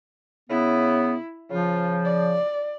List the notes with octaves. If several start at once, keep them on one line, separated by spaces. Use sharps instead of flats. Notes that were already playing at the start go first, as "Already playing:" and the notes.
C#3 B3 E4
C#3 F3 F4
D5